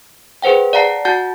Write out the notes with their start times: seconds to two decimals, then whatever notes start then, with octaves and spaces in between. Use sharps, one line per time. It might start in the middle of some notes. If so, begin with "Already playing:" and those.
0.42 G#4 B4 C5 F#5 G5
0.73 D5 F5 F#5 A5 A#5 C7
1.05 F#4 F#5 A5 G6 A6